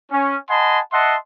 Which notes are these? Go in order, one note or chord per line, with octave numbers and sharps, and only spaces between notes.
C#4
D#5 F#5 G#5 A5 B5 C6
D#5 E5 F#5 A5 C6